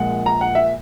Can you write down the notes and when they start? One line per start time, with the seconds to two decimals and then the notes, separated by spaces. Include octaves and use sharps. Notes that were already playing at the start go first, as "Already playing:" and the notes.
Already playing: A#1 A#2 G#3 F#5
0.26 A#5
0.41 F#5
0.55 E5